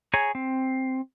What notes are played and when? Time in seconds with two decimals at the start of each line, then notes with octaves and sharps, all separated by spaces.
0.14 G#4 C#5 G#5 A#5
0.35 C4